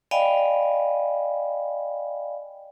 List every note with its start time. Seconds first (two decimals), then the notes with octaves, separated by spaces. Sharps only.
0.11 D5 D#5 F5 G5 G#5 B5